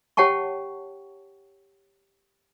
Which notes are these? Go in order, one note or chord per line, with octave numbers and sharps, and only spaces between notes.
G4 C#5 F#5 G5 A5 C#6